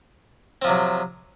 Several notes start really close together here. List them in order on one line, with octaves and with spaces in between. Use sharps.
C4 F3 C3 F#3